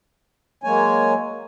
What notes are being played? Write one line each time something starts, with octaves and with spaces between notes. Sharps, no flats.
F#3 G#3 A#3 C#5 G#5